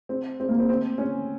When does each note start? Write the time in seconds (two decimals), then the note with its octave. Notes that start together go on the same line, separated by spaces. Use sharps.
0.09 C4
0.40 C4
0.49 A#3
0.59 C4
0.69 C4
0.98 C#4